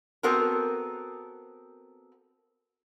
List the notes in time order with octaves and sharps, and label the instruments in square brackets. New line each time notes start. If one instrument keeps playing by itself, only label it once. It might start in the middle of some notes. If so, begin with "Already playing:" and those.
[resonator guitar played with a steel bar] B3 C4 F#4 A4 A#4